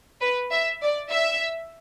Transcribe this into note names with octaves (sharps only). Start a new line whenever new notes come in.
B4
E5
D5
E5